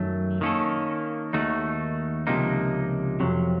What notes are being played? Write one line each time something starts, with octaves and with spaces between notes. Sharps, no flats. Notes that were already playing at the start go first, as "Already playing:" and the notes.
Already playing: F#2 D#3 F#3 A3
D#3 A#3 C#4 A4
D#2 D#3 A3 D#4 F#4
C#2 C3 F3 A#3 D#4
F2 C3 F#3